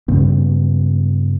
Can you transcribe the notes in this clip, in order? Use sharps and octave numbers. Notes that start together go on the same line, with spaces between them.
G2 C#3 B3